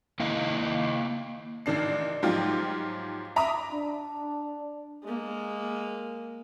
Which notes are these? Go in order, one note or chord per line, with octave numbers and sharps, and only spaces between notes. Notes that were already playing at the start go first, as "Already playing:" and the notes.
A#3 E4 D#5 F5
A1 D#3 D4 C7
G#2 F3 F#3 F4 G4
E5 A#5 B5 D6 D#6
D4
G#3 A#3